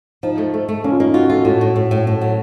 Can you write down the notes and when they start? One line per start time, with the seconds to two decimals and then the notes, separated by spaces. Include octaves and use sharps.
0.23 F3 D#4
0.38 A3
0.54 A3
0.69 A3
0.84 A#3 C#4
0.92 F4
1.00 A#3 D#4
1.14 F4 F#4
1.30 F4 A4
1.45 A2 F#4
1.61 A2
1.76 A2
1.91 A2
2.07 A2
2.21 F#3